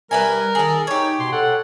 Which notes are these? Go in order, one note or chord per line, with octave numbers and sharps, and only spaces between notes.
G3 A#4 B4 E5 G#5
D#3 G#4 A4
D#4 G4 C#5
B2 C6
A4 F#5